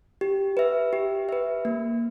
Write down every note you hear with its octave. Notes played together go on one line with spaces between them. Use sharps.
G4
B4 E5
G4
B4 E5
A#3